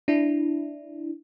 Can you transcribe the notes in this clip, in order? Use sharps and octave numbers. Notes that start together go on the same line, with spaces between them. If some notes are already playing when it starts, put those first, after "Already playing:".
D4 E4